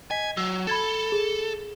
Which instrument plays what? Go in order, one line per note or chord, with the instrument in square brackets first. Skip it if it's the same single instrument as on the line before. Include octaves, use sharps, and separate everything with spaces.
[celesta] D#5 B6 [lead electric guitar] G#5
[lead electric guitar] F#3 [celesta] E6
[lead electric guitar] A4 [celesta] B5 G#6 A6
[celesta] G#4